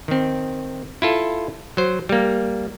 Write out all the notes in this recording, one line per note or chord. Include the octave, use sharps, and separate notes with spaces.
D#3 C4
E4 F4 A4
F#3 C5
G3 A#3